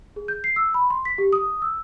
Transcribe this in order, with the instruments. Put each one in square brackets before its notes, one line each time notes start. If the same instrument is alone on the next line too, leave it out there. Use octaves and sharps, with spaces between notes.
[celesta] G#4
G6
C7
E6
B5
C6
B6
G4
D#6
E6